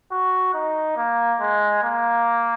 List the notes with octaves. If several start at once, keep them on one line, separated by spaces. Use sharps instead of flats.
F#4
D#4
A#3
G#3
A#3